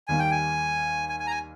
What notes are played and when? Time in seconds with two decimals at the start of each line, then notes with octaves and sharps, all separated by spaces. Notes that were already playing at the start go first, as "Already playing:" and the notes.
0.08 D#2 D#3 G3 A#3 G#5
0.19 G5
0.31 G#5
1.09 G#5
1.20 G#5
1.27 A#5
1.31 G#5